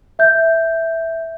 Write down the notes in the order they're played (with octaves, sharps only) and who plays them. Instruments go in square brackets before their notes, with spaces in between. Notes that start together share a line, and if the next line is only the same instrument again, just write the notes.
[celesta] E5 G6